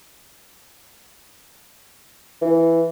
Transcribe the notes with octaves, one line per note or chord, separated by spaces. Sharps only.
E3